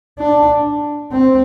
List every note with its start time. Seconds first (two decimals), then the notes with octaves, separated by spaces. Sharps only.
0.19 D4
1.11 C4